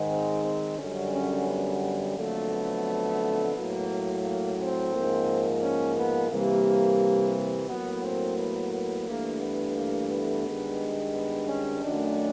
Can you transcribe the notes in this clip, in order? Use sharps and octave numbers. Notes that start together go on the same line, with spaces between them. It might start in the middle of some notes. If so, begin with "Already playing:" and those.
Already playing: G#2 D#3 G#3
C4
C4
F#2 D3 G3 C#4
C#4
B3
B3
F2 D3 F#3 A3 A#3
B3
A2 F#3 A#3
A#3
C4
G#2 F3 A#3
C#4
B3
C3 E3 G3 A#3
A2 F#3 A#3 B3
C4
B3
B3
G2 E3 A3 A#3
B3
A#3
B3
G2 D#3 G#3
B3
C#4
F#2 D#3 F#3 A3 D4